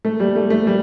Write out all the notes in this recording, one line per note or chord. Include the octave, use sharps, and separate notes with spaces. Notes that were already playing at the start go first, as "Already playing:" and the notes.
A3
G3
A3
A3
G3